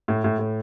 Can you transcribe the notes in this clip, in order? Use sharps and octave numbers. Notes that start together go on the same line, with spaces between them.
A2
A2
A2